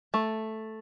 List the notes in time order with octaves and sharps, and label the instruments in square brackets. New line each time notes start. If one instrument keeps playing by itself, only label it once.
[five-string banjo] A3